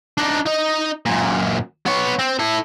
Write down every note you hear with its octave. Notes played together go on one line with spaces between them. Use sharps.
D4 D#4
D#4 D#5
F#2 A#2
B3 C#5
C4
E4 A4